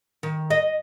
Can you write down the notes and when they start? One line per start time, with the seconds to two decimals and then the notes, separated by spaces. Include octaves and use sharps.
0.23 D#3
0.50 D#5